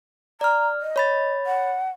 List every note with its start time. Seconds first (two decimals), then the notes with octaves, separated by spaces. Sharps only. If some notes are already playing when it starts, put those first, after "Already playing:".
0.41 D5 A#5 F6
0.81 D#5
0.96 C#5 B5 A6
1.46 F#5